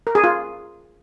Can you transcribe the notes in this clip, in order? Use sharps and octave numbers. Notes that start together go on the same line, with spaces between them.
A#4
G#4
F4